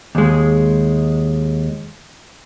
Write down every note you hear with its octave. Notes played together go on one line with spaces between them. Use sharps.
D#2 G#3